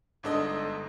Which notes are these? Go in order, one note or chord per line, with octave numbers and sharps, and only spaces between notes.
G1 G#2 D4 A4 D#5